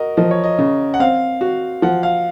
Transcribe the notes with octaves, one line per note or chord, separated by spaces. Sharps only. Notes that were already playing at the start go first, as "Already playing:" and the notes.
Already playing: F#4 A#4 D#5
F3 D#5
C#5
D#5
C#3
F#5
C4 F5
F#4
F3 F#5
F5